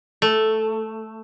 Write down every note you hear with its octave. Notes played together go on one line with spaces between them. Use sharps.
A3